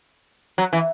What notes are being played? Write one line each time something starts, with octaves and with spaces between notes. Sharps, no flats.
F#3
E3